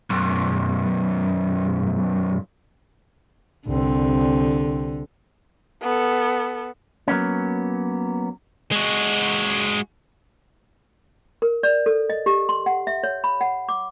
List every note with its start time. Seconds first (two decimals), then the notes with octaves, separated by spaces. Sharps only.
0.10 B1 F#2
3.67 C2 D3 C4
5.82 B3 A4
7.08 F#3 A#3 B3 C#4
8.72 G#3 F#4
11.42 A#4
11.63 D5
11.86 A4
12.10 D#5
12.26 G4
12.49 C6
12.66 F#5
12.87 E5
13.03 C#5
13.24 B5
13.41 F#5
13.69 D6